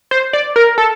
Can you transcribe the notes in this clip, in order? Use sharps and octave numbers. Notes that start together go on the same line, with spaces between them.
C5
D5
A#4
A4